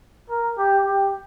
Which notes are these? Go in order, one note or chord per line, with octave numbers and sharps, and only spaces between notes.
A#4
G4
G4